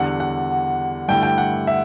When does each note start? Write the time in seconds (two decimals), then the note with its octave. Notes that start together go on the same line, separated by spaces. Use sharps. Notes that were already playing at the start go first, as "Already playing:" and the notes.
Already playing: E2 D3 G3 F#5
0.20 F#5
1.08 G2 D3 A3 E4 G5
1.23 G5
1.38 F#5
1.67 E5